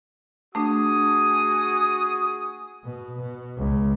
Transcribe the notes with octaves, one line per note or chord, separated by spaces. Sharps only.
A3 D4 F#4 G#4 D#6
B2
B2
C#2